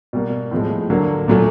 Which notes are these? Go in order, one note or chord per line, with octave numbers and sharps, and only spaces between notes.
B2 G3 A#3
A2 F3 G#3
D3 F#3 A#3
A#2 F#3 A3